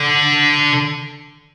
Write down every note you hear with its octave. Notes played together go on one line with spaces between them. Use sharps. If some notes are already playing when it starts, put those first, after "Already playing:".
Already playing: D3